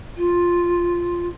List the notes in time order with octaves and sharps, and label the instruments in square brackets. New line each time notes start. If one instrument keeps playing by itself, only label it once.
[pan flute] F4